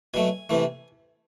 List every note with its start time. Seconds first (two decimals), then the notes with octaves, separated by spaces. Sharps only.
0.14 B2 F#3 A3 G#5
0.50 C3 E3 A3